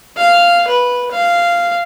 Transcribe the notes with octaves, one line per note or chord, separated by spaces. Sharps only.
F5
B4
F5